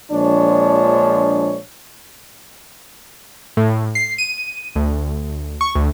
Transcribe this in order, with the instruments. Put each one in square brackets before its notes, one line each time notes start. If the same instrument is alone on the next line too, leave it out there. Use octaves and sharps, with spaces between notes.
[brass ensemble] A#1 F3 G#3 D4 C#5
[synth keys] A2
C7
D#7
D2
C#6
D2